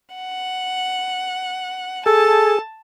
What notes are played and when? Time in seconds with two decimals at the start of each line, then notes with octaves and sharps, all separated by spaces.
0.15 F#5
2.06 G#4 A4 A5